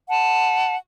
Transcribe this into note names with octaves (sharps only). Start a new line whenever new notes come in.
F#5 A5